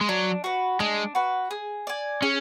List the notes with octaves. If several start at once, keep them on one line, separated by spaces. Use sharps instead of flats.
G#3
F#3 D4
F#4 B4
G#3 D4
F#4 B4
G#4
D5 G#5
C#4 G#4